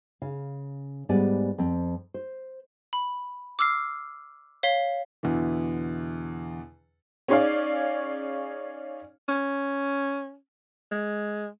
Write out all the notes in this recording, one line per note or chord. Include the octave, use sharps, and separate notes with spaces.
C#3 F5
G#2 G3 B3 D5 G#5
F2 C4
C5
B5
D6 E6 F6 C7
C#5 F5 B6 G7
E2 B2 D3 E3
C#4 D#4 G#4 C#5 D5 F5
C#4
G#3